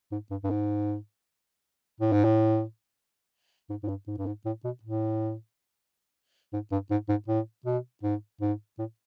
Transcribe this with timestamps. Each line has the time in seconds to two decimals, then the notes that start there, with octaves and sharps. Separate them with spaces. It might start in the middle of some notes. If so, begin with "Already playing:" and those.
0.11 G#2
0.30 G2
0.44 G2
0.50 G#2
2.00 A2
2.12 G#2
2.24 A2
3.69 G#2
3.83 G#2
3.88 G2
4.07 G#2
4.18 G2
4.26 G#2
4.45 A2
4.64 B2
4.83 A2
6.53 G#2
6.71 G2
6.91 G#2
7.09 G#2
7.28 A2
7.66 B2
8.03 G#2
8.41 G#2
8.79 A2